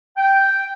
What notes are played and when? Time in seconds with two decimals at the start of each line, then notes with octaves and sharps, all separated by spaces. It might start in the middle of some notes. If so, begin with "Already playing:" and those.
0.18 G5